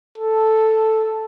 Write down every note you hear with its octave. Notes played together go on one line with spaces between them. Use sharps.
A4